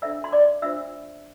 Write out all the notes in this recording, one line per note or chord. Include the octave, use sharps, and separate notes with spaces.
D4 A4 C5 E5 E6
C6
D5 D6
D4 F4 C5 E5 E6